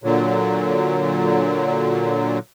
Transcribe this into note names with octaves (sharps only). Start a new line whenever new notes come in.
A#2 D3 F#3